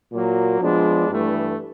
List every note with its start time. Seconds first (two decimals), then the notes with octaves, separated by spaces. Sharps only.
0.11 A#2 F#3 A#3
0.59 F3 G#3 B3 D4
1.08 G2 E3 A3